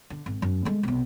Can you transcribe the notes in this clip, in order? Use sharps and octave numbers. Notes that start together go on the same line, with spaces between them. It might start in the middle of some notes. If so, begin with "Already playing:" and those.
D3
G#1
F#2
G#3 A3
B1 C3